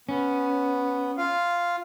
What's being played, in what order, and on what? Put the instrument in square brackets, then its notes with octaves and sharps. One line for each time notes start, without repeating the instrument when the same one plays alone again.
[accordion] B3 [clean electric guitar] C#4
[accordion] F4 F5